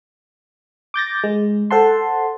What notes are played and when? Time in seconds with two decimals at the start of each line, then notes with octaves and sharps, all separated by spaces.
0.94 D6 G6 A6 A#6
1.24 G#3
1.71 A4 C5 F#5 A5 C6